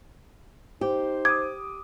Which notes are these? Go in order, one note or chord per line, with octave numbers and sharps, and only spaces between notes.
D#4 G4 C5
D6 D#6 G#6